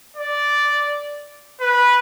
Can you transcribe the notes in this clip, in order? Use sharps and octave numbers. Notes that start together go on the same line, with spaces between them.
D5
B4